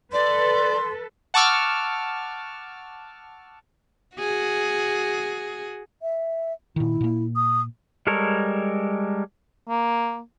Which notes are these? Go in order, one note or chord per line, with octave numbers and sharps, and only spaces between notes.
A4 B4 D5 C6
F#5 A5 C#6 D6 E6 F6
F#4 G#4
E5
A#2 D#3 E4
A#2 A#3
D#6
G3 G#3 A4 A#4 C#5
A#3